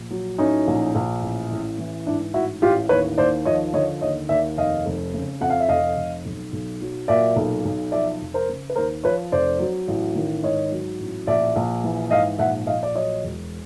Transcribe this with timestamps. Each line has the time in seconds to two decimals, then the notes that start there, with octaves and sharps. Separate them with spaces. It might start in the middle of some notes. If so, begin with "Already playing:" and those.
Already playing: A#1
0.11 F#3
0.38 A2 C#4 D#4
0.67 A#1
0.95 A#1
1.22 A1
1.51 A1
1.78 E3
2.06 G#2 D4 E4
2.34 A1 E4 F#4
2.62 A1 F4 G4
2.89 D#2 B4 C#5
3.18 D#2 C5 D5
3.45 F3 C#5 D#5
3.73 D3 C#5 D#5
4.01 D#2 C#5 D#5
4.29 D#2 D5 E5
4.57 F1 D#5 F5
4.86 F1
5.14 C#3
5.41 F2 F#5
5.50 F5
5.60 E5
5.69 F1 D#5 F5
5.97 F1
6.25 B1
6.52 B1
6.81 F#3
7.08 A#2 D5 E5
7.36 B1
7.65 B1
7.92 F3 D5 E5
8.21 F1
8.34 A#4 C5
8.49 C#3
8.70 B4
8.76 D#2 A#4 C5
9.04 F3 B4 C#5
9.32 F1 C5 D5
9.59 F#3
9.88 A1
10.15 D#3
10.43 G#2 C#5 D#5
10.72 F#3
11.00 A1
11.27 A#1 D5 E5
11.56 A#1
11.84 E3
12.11 G#2 D#5 F5
12.39 A#1 E5 F#5
12.66 A#1 D#5 F5
12.83 D5
12.95 F#3 C#5 D#5
13.23 E1